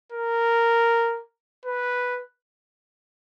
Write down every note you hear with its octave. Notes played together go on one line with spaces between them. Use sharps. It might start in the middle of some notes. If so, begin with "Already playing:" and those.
A#4
B4